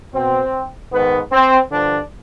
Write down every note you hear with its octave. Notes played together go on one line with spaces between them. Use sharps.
B2 C4
G#2 D#3 B3
C4
G2 D3 F3 D4